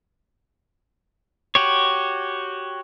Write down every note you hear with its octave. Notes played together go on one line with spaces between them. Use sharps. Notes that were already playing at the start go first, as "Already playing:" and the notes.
F#4 G4 C#5